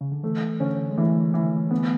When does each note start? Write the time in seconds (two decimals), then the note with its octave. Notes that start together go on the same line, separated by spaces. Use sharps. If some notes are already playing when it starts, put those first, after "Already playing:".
0.01 C#3
0.12 D3
0.23 E3 A3
0.60 D3 C#4
0.90 G#3
0.97 E3 A3
1.34 E3
1.71 B3